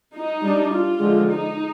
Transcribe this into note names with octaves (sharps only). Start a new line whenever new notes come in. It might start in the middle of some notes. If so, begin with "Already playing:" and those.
D#4
G3 D4
F4
D3 F3 G#3
D#4